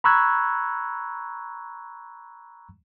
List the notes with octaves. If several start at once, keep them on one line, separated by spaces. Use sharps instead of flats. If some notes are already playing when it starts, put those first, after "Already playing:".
A#5 B5 C#6 E6 F#6 G#6